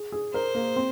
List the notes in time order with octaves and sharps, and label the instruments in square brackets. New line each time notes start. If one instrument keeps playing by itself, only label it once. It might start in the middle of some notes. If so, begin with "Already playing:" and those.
Already playing: [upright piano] G#4
G#4
[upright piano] A#4 [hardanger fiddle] C5
[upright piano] A#3
C4